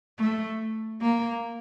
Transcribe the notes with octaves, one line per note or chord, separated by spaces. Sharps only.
A3
A#3